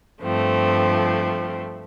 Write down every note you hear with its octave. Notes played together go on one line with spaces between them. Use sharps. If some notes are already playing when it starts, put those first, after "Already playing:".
G2 F3 A3 C4